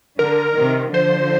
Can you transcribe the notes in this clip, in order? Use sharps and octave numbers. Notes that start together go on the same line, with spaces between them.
D3 A#4
C3 D#3
D3 F3 C5